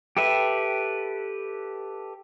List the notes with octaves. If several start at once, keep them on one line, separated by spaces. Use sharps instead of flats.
G4 A4 B4 E5